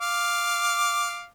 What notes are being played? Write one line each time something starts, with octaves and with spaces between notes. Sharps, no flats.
F5 D6